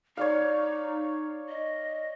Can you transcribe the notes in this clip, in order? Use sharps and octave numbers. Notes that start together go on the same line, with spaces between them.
D#4 C#5 D5 F5
D#5